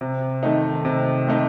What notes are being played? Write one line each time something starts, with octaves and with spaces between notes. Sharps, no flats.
C3
D#3 A3 D#4
C3
D#3 A3 D#4